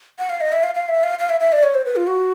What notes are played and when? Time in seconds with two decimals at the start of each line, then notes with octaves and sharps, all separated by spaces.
0.19 F#5
0.30 F5
0.41 D#5
0.52 E5
0.63 F5
0.75 F5
0.89 E5
1.03 F5
1.19 F5
1.30 E5
1.40 E5
1.52 D5
1.63 C#5
1.74 C5
1.85 B4
1.96 F4
2.07 F#4